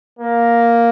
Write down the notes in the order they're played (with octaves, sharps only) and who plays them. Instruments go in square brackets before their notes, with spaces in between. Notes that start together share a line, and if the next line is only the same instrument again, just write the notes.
[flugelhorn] A#3